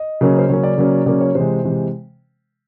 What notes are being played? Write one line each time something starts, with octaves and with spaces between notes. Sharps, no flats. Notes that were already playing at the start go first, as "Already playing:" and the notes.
Already playing: D#5
C#3 F#3 A#3 C#4
C5
C#3 F#3 A#3 C#4 C#5
D5
C#3 F#3 A#3 C#4
C#3 F#3 A#3 C#4 D5
C#5
C3 E3 G#3 C5
C3 E3 G#3